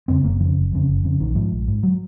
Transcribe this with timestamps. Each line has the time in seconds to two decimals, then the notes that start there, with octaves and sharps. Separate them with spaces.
0.08 F2 C#3 C4
0.24 F#1 A#3
0.40 F2 D#3
0.44 C#3
0.57 F#1
0.72 F2 C#3
0.87 F#1
1.04 F2 C#3
1.20 A#1 D#3
1.35 G#2 F3
1.52 A#1
1.68 G#2
1.83 F#3